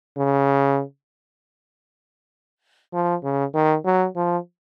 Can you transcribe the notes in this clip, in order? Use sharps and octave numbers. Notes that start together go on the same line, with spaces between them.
C#3
F3
C#3
D#3
F#3
F3